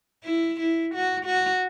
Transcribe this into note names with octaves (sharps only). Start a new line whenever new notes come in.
E4
E4
F#4
F#4